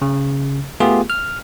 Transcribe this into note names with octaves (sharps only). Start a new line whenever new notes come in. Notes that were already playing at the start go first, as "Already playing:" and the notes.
C#3
A3 B3 F4 G4 G#4
F6